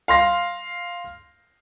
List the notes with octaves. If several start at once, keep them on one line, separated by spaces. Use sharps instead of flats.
F5 C6 A#6